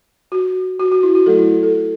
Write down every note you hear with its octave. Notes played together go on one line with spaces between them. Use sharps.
F#4
F#4
F#4
E4
F#4
F#3 A3 E4 A4
E4
A4
A4